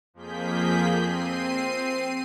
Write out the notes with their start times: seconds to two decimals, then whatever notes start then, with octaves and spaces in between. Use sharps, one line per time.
0.14 F2 F3 A#3 G#4 G6 B6
0.97 C4 C7 D#7